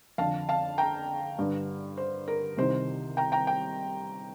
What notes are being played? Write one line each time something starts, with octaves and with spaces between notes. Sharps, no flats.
F2 D3 F5 A5
F5 A5
G5 A#5
G2 D3
C5
A#4
C2 C3 D#3 C5
G5 A#5
G5 A#5
G5